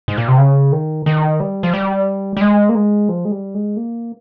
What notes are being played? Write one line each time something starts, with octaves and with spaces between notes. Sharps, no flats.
G#2
A#2
C3
C#3
D#3
D#3
G3
F3
G3
G3
G#3
A#3
G#3
F3
G#3
G3
G#3
A#3